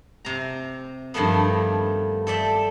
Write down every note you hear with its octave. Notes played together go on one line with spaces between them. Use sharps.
C3 A#5
G2 D#3 F3 A3 B3
A4 D5 E5 G5